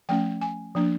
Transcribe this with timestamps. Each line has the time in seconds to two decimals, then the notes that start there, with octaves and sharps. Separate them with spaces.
0.09 F3 A3 C#4 G5
0.41 G#5
0.75 F3 A#3 D4